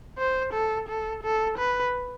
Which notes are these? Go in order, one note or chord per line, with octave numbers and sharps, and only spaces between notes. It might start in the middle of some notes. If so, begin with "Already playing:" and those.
C5
A4
A4
A4
B4